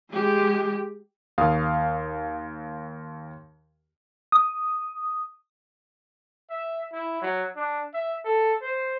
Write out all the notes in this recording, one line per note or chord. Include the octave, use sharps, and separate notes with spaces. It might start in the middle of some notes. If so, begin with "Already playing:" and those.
G#3 G4
D#2 F5 D#6
D#6
E5
E4
F#3
D4
E5
A4
C5